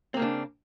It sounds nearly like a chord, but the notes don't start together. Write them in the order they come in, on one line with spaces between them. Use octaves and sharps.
C4 A#3 C#3 D4